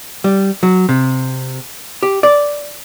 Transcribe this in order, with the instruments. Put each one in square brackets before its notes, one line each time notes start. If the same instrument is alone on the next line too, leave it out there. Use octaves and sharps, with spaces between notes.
[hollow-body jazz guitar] G3
F#3
C3
G4
D5